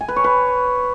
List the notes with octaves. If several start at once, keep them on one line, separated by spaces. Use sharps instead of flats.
G#5
B4
C#5
B4